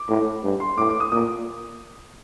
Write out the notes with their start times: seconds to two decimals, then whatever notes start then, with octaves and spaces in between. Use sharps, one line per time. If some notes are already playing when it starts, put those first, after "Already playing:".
Already playing: D6
0.09 A2
0.44 G2
0.60 C6
0.77 A2 D6
0.89 D6
1.00 D#6
1.12 A#2 D#6